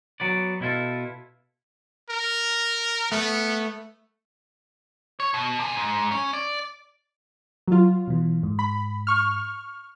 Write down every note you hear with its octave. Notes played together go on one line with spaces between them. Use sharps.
F#3 B3 D5
B2 E4 F4 A4
A#4
A3 B3
C#5
B2
C3 G#5
G#2
C#4
D5
F#3 F4
B2 E3
G#2
B5
C#6 F6